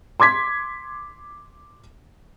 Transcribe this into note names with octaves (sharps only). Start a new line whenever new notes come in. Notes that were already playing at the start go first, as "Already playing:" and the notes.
C6 D6 G#6 B6